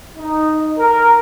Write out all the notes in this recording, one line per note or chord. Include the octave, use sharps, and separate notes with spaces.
D#4
A#4